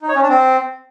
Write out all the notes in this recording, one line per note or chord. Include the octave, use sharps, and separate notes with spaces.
D#4
C#5
C#4
D4
C4